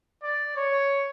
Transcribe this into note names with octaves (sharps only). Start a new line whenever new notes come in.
D5
C#5